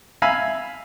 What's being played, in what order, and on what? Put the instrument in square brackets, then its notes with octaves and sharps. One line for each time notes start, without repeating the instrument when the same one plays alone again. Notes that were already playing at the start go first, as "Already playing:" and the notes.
[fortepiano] E5 F5 G#5 B5 E6